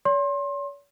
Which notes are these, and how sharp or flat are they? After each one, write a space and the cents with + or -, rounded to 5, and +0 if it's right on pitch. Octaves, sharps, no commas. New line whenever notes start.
C#5 +45 C6 +30